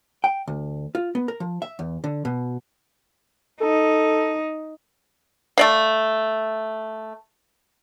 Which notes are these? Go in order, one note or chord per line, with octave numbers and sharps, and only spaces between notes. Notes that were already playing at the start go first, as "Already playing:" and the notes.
G5
D2
F4
B3
A#4
F3
E5
E2
D3
B2
D#4 A4
A3 D5 F5